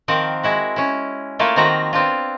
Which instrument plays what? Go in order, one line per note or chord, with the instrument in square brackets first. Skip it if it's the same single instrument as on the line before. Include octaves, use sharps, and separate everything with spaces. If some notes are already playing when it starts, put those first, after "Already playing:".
[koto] D#3 F3 C4 A#4 F5 F#5
G#3 E4 F#4
C#4 E4
A3 A#3 E4 F4 A4
D#3 F3 C4 F4 F#4 A#5
B3 C4 D4 F4